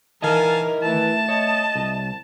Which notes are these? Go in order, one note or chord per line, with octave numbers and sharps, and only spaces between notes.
D#3 E3 E4 A#4 D#5 F5 G#5 A5
E3 A3 A5
C#5 D#5
C2